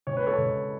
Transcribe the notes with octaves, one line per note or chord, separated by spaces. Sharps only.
C#2 C#5
B4
A4 C#5
C#2